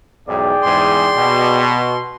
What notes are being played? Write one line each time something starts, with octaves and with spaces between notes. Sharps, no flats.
B1 E2 G#2 G#4 D5 G5
E2 G#2 C6
B2